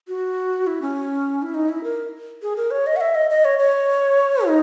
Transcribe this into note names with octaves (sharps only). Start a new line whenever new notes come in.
F#4
E4
C#4
E4
D#4
E4
A#4
G#4
A#4
C#5
D#5
F#5
E5
D#5
D#5
C#5
C#5
D#4